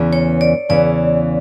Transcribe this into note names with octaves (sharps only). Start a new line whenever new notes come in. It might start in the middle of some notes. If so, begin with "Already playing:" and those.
Already playing: E2 C#3 E3
C#5
D5
E2 C#3 E3 D5